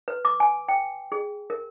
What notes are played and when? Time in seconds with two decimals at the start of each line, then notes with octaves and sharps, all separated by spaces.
0.08 B4
0.25 D6
0.40 G#5
0.69 G5
1.12 G#4
1.50 A#4